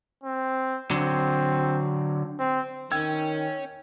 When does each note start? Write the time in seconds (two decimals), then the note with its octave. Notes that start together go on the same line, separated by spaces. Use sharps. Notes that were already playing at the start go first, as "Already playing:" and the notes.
0.24 C4
0.91 D3 F#3 C4
2.39 C4
2.92 D#3 C#4 G5 E6 G#6